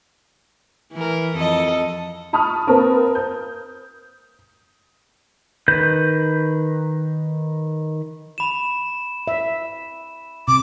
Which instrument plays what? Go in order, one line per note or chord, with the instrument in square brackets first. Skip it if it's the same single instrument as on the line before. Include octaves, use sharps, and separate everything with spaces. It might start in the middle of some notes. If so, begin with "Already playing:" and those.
[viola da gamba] E3 A#4
F2 A4 D#5
[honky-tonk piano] A5 B5 C#6 D#6 F6
A#3 C4 A#4 B4 A5
G6
[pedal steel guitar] D#3 B4 G6
[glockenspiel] B5 E7
[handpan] E5
[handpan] C3 [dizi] D6